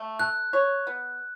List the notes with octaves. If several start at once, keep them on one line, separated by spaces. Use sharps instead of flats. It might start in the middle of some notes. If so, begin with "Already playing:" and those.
Already playing: A3
A4 F#6
C#5
B3